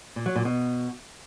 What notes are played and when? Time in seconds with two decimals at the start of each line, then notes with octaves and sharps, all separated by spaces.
0.16 A#2
0.26 F#3
0.36 A#2
0.45 B2